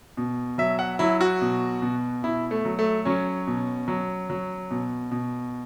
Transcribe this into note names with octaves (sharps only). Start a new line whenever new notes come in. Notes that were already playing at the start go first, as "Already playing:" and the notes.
B2
F#3 E5
F#5
F#3 E4
F#4
B2
B2
B2 E4
A3
F#3
A3
F#3 C#4
B2
F#3
F#3
B2
B2